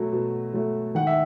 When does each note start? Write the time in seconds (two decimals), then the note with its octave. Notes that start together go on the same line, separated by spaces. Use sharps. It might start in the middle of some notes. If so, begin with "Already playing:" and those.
Already playing: B2 F#3 A3
0.13 B2
0.54 F#3 A3
0.95 D#3 F#5
1.07 E5